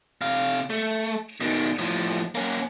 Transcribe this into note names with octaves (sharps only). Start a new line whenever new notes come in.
C3 F5
A3
B2 D#3
A2 F3
A#3 C#4